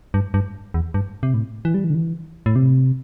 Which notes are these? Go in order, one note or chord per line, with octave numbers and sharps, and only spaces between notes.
G2
G2
E2
G2
C3
A2
E3
G3
E3
D3
E3
A2
C3